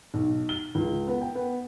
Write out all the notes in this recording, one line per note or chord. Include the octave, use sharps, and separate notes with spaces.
B1
G7
C#2
B3
G5
B3